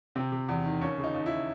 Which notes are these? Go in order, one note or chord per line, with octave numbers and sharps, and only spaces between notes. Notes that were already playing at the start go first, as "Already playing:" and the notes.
C3 C4
C3
E2
D#3
D#2 C#4
C#3
D#4
D#2
E4